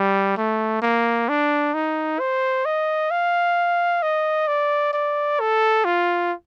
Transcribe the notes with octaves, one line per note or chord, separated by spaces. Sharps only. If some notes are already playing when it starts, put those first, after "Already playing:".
Already playing: G3
A3
A#3
D4
D#4
C5
D#5
F5
D#5
D5
D5
A4
F4